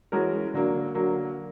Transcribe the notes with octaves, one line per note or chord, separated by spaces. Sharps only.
E3 G#3 C#4 F#4 A#4
D3 F#3 A#3
D3 F#3 A#3